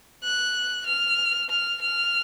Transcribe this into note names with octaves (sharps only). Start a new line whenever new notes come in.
F#6
F6
F6
F6